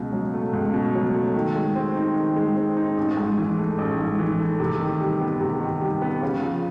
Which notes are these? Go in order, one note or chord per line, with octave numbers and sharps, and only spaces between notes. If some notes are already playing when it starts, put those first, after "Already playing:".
Already playing: C#2 B2
F#3
A3
C#2
B2
F#3
A3
D#3
G#3
C4
D#4
D#3
G#3
C4
D#4
A1
G#2
E3
A3
A1
G#2
E3
A3
C3
D#3
G3
B3
C3
D#3
G3
B3
C#3
F3